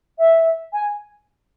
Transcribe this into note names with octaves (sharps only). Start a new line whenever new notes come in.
E5
G#5